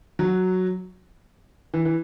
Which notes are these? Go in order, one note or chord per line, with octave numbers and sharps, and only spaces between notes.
F#3
E3
E3